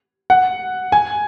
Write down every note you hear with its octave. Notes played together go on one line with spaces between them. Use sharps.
F#5
G#5